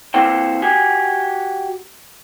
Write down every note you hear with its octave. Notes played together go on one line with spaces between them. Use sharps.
A#3 C4 E4 A4 C5 G5
F#4 G4 G#5